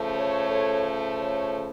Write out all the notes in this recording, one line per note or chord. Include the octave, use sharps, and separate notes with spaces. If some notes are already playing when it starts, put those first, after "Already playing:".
Already playing: C#3 F3 A3
A4 C#5
A4 C#5
A4 C#5